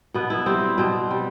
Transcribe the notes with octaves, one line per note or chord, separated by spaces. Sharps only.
B2 B3
E4
G3 C4
B2 C4
G3